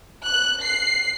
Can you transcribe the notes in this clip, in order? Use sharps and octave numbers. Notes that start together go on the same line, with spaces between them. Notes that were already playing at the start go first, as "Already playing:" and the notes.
F#6
C7